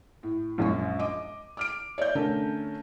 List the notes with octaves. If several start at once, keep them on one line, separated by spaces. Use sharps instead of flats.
A2
A#1 F#2 G#3 C#6
D#5 D6
D6 F6 D7
C#5 D5 E5 G6
D3 A3 C#4 A#4